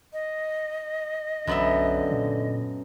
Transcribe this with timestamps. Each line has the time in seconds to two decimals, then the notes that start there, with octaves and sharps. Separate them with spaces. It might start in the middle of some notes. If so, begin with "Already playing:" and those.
0.13 D#5
1.47 B1 F#2 D3 B3 E5
2.11 A#2